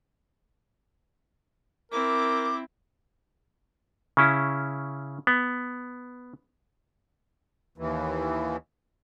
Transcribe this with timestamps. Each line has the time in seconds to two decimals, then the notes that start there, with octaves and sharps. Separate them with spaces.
1.92 C4 E4 A#4 D6
4.17 C#3 C#4 E4
5.27 B3
7.78 D#2 E3